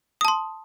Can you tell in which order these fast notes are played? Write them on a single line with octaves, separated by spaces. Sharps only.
D#6 A5 C6